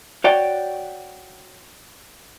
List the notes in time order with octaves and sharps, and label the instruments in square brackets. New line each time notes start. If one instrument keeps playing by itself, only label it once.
[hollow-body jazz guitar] F#4 C#5 D5 G5